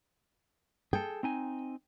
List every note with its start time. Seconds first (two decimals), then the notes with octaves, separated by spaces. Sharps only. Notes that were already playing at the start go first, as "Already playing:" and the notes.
0.93 G#4 A4 G5
1.23 C4 D#4 G#5